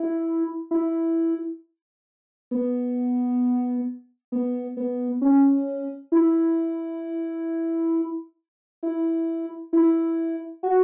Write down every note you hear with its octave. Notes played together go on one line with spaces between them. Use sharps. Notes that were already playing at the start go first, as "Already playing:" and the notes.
Already playing: E4
E4
B3
B3
B3
C#4
E4
E4
E4
F#4